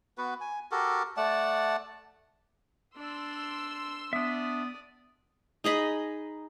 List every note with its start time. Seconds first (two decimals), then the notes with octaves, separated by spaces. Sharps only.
0.18 B3 F#4 B4
0.41 G#5
0.71 F#4 G4 A4 A#4
1.17 A3 D5 F#5 A5
2.96 D4 D5 C6 E6
4.13 B3 D4 D5 E5 D#6
5.64 D#4 G#4 D#5 B5